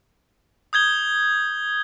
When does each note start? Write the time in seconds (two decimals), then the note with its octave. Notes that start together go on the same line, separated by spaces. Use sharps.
0.73 D#6 G6 G#6 G7